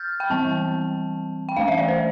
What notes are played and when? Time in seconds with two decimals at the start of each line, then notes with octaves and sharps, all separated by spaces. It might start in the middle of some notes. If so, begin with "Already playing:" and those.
Already playing: F6 G6 A6
0.20 G5
0.30 E3 G3 C4 A5
1.49 G5
1.56 E3 A3 D4 F5
1.68 E5
1.78 D5
1.88 C5